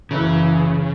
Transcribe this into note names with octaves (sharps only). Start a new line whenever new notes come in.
F#1 C#3 E3